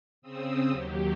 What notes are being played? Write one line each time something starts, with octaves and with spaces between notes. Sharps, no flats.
C#3 C4 D#6 E6
D#2 F#3 G4